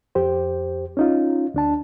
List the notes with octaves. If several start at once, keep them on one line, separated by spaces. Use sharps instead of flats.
F2 G4 C5
C#4 D#4 F4
D2 D4 A5